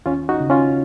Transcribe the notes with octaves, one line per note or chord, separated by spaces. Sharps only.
D#2 C#4 F4
D#4 F#4
C#3
C#4 F4